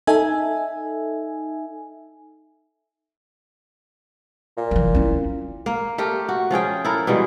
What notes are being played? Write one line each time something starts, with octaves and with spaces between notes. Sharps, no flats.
D#4 A4 E5 G#5
A#2
E3 F3
C#4 E4
A#3
A3 G4 A#4
F#4
F3 C#4 G#4 G5
E4 A4 A#4
B2 E3 G3 G#3